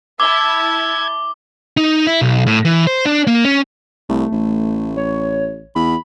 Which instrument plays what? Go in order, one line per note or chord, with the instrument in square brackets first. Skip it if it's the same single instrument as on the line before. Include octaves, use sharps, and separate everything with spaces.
[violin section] E4 A5 [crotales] D6 G7 [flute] E6 [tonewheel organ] G#6
[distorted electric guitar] D#4
E4
B1
A2
E3
C5
D4
A#3
C#4
[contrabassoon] C2 [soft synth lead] A3
[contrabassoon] A1
[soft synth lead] C#5
[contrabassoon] E2 [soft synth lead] B5